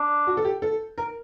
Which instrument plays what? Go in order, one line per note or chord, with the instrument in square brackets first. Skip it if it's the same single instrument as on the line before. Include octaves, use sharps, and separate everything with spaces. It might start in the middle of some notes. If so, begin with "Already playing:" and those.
Already playing: [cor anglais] D4
[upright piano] F#4
A4
G4
A4
A#4